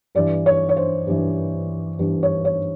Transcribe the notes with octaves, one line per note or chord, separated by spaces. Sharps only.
G2 E3 D5
C#5
C#5
C5
G2 E3
G2 E3
C#5
C#5